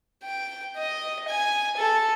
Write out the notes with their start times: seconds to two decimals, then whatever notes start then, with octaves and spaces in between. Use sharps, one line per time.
0.24 G5
0.77 D#5
1.28 G#5
1.78 A4